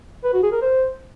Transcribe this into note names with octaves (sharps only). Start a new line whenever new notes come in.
B4
F#4
G#4
A#4
C5